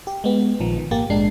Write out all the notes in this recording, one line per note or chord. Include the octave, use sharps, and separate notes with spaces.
G4
G#3 B3
A#1 D#3 F3
D#3
G#1 A#3 G4 A6
A#1 G#2 G#3 D4 C7